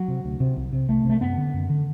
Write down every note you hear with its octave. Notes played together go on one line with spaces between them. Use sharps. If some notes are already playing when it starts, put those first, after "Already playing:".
Already playing: F#3
C3
D2
C3
C2
C3
C2 A3
C3 A3
F#2 B3
D3
F#2
D3